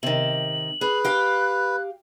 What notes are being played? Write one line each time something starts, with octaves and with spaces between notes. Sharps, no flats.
C3 D#3 F#7
G#4 B4
G4 F5 G5 F#6